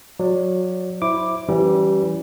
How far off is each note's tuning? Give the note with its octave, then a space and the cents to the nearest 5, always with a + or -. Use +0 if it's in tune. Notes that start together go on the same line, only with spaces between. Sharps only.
F#3 -20 D5 +0
E4 -5 C5 +0 D6 +0
E3 +0 G3 -25 C#4 +5